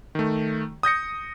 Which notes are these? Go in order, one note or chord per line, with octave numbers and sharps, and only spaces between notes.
D#3 A3
D#6 G6 A#6 C#7